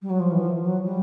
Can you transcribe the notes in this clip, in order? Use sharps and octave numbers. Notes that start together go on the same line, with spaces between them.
G3
F#3
F3
E3
F3
F#3
G3